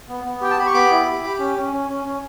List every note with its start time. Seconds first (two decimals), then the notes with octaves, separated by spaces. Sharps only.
0.09 B3
0.25 B3
0.41 G4 G5
0.51 A5
0.57 G4 B5
0.67 C#6
0.74 B3 B5 D6
0.91 E4
1.07 G4
1.24 G4
1.39 C#4
1.56 C#4
1.73 C#4
1.89 C#4
2.05 C#4